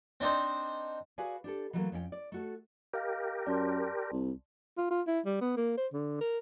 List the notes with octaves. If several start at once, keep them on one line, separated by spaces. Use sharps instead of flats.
C4 D4 D#4 C5
F#4 G#4 B4 D5 F5 G#5
D4 G4 A4
E3 F#3 G3 A3 A#3
F2 C#4 F4 G5
D5
A3 F#4 A4
G4 A#4 D#5 F5 F6
F#2 D5 A5 C6
C2
F4
F4
E4
G3
B3
A#3
C5
D3
A#4